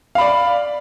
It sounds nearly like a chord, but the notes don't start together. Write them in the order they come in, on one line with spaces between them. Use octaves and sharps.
F5 B5 D5